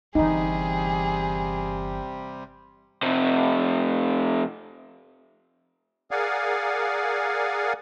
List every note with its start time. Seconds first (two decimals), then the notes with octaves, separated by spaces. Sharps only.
0.15 G1 C3 E3 G3 D#4 G#4
3.03 F2 C3
6.11 G#4 A#4 D5 F5 F#5 G#5